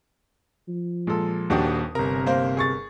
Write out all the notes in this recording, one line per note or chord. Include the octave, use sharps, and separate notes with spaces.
F3
A#2 G#3 A4
D#1 D#2 D4 F#4 G4 D#6
G1 C3 A#4 A#5
A#3 C5
G#4 C#6 A6